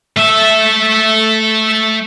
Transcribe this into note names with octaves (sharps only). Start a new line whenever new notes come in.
A3 E5